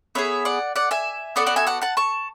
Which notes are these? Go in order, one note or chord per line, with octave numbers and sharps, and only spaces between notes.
B3 D4 G#4 C#5 E5
D5 F#5
D5 F#5
E5 G#5
B3 F#4 A4 D5 F#5
D5 F#5
E5 G#5
D5 F#5
F#5 A5
A5 C#6